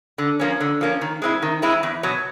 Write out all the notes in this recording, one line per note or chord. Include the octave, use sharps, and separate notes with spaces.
D3
F3 A#3 C#4
D3
F3 A#3 C#4
D#3
G#3 C4 E4
D#3
G#3 C4 E4
E2
B2 F#3